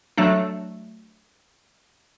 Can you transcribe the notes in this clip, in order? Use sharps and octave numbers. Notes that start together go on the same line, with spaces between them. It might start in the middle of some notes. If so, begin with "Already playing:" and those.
F#3 A3 D4